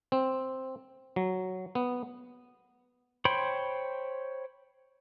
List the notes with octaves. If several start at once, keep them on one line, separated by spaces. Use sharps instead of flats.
C4
F#3
B3
C5 C#5 G5 B5 C6